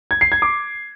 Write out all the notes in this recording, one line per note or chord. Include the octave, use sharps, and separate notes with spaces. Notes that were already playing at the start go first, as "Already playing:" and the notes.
G#6
C7
G#6
D6